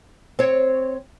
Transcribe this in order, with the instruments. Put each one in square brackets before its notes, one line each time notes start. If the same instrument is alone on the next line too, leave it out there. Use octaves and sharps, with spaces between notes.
[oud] C4 C#5